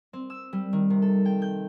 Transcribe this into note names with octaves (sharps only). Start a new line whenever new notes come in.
C4
E6
G3
D#3
C3
A4
G5
G6